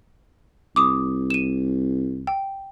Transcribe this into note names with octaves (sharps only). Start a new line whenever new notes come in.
C2 D6 D#6
D#7 E7
G5